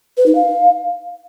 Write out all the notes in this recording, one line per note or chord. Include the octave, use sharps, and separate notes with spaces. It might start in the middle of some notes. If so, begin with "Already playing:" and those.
B4
D#4
F5